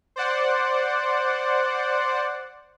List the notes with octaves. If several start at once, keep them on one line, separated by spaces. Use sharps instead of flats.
C5 D5 F#5